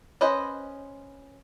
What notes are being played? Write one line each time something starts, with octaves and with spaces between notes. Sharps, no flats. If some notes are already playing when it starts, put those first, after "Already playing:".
C#4 B4 C5 D#5